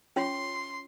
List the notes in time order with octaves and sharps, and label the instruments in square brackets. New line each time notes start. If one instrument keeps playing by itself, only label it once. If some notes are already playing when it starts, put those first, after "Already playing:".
[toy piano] C#4 F4 C#5 [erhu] C6